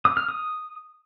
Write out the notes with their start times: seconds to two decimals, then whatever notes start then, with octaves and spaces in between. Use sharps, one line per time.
0.05 D#6
0.17 F6
0.29 D#6